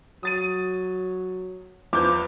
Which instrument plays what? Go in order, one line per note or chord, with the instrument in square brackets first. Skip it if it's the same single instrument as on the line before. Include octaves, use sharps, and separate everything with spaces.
[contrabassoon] F#3 [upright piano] D#6 A6 D#7
[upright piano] E2 B4 G6 [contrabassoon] F3 [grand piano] D6